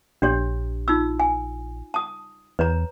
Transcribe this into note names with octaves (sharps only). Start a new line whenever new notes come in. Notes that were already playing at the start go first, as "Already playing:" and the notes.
A#1 D4 G4 C#5
D#4 F4 E6
G#5
A5 D#6
E2 B4 C#5 A#5